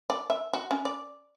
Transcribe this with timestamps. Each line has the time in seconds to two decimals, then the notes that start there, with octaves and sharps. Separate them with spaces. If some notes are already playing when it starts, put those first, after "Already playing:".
0.10 D5
0.30 E5
0.53 F#4
0.71 C#4
0.85 D5